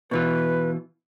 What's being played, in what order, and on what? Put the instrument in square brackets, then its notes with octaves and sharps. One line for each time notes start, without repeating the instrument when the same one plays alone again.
[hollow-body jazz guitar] B2 E3 F4 [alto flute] B4